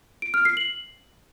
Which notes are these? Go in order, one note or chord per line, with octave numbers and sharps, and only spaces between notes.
D7
F6
C7
F#7